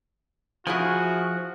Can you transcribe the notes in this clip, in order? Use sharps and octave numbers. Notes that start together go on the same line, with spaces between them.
F3 E4 F#4 G#4 G#5